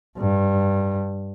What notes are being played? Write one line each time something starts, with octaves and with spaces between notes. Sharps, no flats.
G2